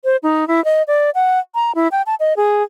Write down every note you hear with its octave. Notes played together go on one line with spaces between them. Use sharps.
C5
D#4
E4
D#5
D5
F#5
A#5
E4
G5
A5
D#5
G#4